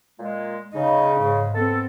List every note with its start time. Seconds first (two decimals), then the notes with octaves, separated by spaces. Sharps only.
0.20 A#2 G#3
0.75 C#3 D#4
1.20 G#2
1.55 B3 C4 A4